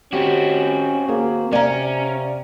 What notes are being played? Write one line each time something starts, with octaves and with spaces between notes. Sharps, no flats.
C4 C#4 F#4 G4
A#3 G#4
C3 C#4 D5 F5 A#5